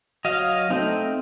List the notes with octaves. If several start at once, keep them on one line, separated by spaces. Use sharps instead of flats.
F#3 D#5 F5
A3 C4 D#4